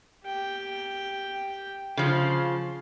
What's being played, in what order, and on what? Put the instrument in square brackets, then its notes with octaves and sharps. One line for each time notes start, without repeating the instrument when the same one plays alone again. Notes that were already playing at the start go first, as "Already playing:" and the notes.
[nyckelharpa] G4 G5
[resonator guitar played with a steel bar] C#3 F3 [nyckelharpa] A5 C6